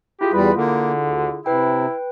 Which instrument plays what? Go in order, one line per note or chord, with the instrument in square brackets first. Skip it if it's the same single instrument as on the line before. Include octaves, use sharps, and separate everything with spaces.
[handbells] E4 F4 G#4 [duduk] G4
[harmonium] E2 G3 [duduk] B4
[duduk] D3 [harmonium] A#3
[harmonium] D2
[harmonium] C3 [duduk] E4 [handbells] B4 G5